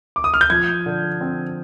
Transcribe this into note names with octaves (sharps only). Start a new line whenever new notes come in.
D6
D#6
F6
G6
F3 G#6
D3
C4